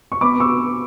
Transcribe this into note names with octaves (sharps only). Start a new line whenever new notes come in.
C#6
B3 B5 D6
C#6 E6